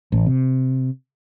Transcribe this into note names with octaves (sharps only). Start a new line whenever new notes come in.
A1
C3